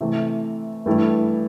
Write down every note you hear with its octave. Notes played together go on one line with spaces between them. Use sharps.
C3 E3 A3
G2 E3 A3 E4